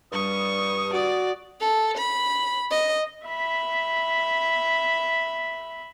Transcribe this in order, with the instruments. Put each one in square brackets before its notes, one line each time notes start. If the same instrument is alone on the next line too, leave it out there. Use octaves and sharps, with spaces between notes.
[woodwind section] G2 G3 D#6 [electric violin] C#6
[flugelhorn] F#4 [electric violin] D5
[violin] A4
B5
D#5
[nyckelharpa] E5 B5